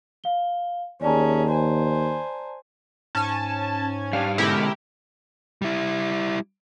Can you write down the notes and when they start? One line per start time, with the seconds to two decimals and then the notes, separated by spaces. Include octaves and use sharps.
0.24 F5 G7
1.02 D#2 C#4 G#4 D5 A5 A#5
1.50 C5 G#5
3.15 G#2 C#4 G#5 A5
4.13 G3 D4 F5
4.38 B2 D3 G#3 E4 G4 A#4
5.62 G3 E4